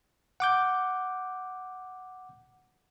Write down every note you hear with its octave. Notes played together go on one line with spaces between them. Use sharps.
F#5 D6 G6